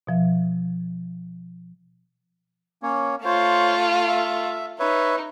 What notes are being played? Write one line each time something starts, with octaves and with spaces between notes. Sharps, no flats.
B2 F3 E5
A#3 C#4 C#5
A3 F4 C5 C#5
E5
D#4 B4 C#5 E5